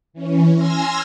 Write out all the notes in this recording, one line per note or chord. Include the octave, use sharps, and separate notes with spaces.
E3 C#4
G#5 C6 E6 F6 G#6 A#6